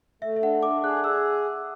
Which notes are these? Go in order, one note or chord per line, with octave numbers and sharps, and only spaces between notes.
A3 E5
E5
D4 F#5
D4 D6
G#4 F#6
G#4 E6